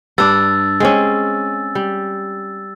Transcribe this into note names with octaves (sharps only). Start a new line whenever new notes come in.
G2 D4 E6 A6
G#3 C4 C#4
G3